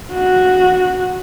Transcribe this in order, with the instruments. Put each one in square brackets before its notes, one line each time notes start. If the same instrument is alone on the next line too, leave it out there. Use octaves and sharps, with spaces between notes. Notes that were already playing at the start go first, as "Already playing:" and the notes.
[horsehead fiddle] F#4